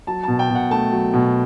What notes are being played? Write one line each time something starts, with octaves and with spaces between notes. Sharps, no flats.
F#3 A5
B2 A5
G5
B2
F#5
A3 A5
F#3
B2